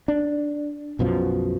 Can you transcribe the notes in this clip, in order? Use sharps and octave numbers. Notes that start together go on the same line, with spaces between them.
D4
B1 F#2 B2 F3